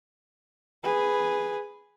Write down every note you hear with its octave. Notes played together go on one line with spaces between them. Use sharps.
G#4 B4